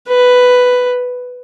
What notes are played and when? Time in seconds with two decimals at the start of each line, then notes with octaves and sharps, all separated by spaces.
0.08 B4